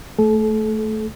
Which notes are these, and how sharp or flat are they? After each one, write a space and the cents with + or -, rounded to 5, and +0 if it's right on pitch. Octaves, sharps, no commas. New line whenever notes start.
A3 +0 A4 -35